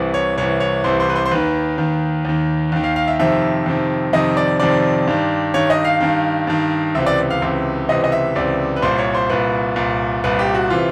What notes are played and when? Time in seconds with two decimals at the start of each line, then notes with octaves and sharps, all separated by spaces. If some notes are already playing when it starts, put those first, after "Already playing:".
Already playing: C2 C3 E3
0.14 C#5
0.38 C2 C3 E3 C#5
0.60 C#5
0.84 C2 C3 E3 C5
1.00 C5
1.09 B4
1.15 C5
1.25 C5
1.31 D#2 D#3 B4
1.78 D#2 D#3
2.25 D#2 D#3
2.72 D#2 D#3
2.84 F5
2.96 F5
3.08 E5
3.19 F2 C3 D#3 E5
3.66 F2 C3 D#3
4.13 F2 C3 D#3 D#5
4.37 D5
4.60 F2 C3 D#3 D5
5.07 G2 D#3
5.54 G2 D#3 C#5
5.70 D#5
5.85 F5
6.00 G2 D#3
6.47 G2 D#3
6.94 C#2 C3 E3 E5
7.06 D5
7.30 F5
7.42 C#2 C3 E3
7.89 C#2 C3 E3 D#5
8.04 D#5
8.12 E5
8.35 C#2 C3 E3 D5
8.76 B4
8.82 C2 A#2 C5
8.98 C#5
9.14 C5
9.29 C2 A#2 B4
9.76 C2 A#2
10.24 C2 A#2 B4
10.39 G4
10.55 F#4
10.70 C3 E3 F4